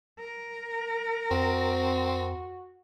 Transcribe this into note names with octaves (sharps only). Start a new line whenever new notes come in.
A#4
F2 C4 F#4